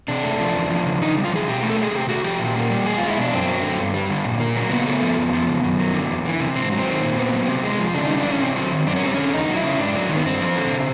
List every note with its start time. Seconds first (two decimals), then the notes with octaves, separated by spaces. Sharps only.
0.08 C3 D4
0.24 A3
0.40 F3
0.55 E2
0.70 F3
0.86 C#3
1.02 C#3 D#4
1.17 G3
1.24 F4
1.32 E3 G#4
1.48 B2 G4
1.63 A3
1.70 A4
1.79 F#3 G#4
1.94 C3 G4
2.09 A3 F#4
2.24 F3 G4
2.40 A#2
2.56 A#3
2.70 G3
2.86 E2 G#4
2.98 G#3 F4
3.09 E4
3.17 B2 D4
3.32 F#2 C4
3.47 F#3
3.63 D3
3.79 G2
3.94 G3
4.09 D3
4.25 A#2
4.40 A#3
4.56 F#3
4.70 C#3 B3
4.87 A3
5.02 F3
5.17 F2
5.33 F3
5.48 C#3
5.63 F#2
5.79 F#3
5.94 D3
6.09 E2
6.26 E3
6.40 C3
6.55 G#2 C4
6.72 F#3
6.79 C4
6.87 D#3
7.02 A#2
7.17 B3
7.33 F#3
7.48 C3
7.64 G#3
7.79 F3
7.94 C#3 D4
8.06 G3 D#4
8.18 D4
8.26 E3 C#4
8.40 C3 C4
8.56 F#3
8.72 D#3
8.87 F#2 D4
8.96 C#4
9.03 G3 C4
9.14 D3 C#4
9.33 E2 D#4
9.49 F#3
9.56 E4
9.64 C#3
9.79 G#2 D4
9.95 F#3
10.09 D#3
10.16 B3
10.25 G2 C4
10.41 F3
10.56 D3
10.72 C#3